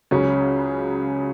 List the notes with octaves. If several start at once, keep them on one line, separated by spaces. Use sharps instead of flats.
C#2 C#3 F#3 C#4